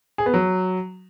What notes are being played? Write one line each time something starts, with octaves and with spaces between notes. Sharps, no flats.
G#4
B3
F#3